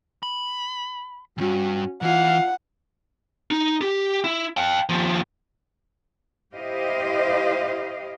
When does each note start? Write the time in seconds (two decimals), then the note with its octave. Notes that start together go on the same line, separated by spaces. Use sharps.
0.23 B5
1.38 D2 G2 C#4 F#4
2.02 E3 F4 F5 F#5
3.51 D#4
3.81 G4
4.24 E4
4.57 F5 G5
4.89 D#2 F3
6.54 E4 G4 C5 D#5 F5